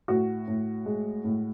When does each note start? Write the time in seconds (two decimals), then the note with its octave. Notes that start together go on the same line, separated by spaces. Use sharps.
0.08 A2 F#4
0.48 A2
0.86 G#3
1.24 A2